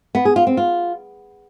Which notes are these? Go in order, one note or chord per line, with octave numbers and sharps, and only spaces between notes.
B3
G#4
F4
C4
F4